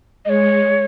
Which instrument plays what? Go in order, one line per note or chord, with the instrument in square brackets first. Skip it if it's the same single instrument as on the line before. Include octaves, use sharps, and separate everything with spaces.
[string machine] G#3 [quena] D#5
[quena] C#5